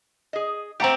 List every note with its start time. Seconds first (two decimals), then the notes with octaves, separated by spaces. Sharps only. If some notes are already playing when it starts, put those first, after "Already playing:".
0.33 G#4 D#5
0.80 A3 C4 G4 F#5 A#5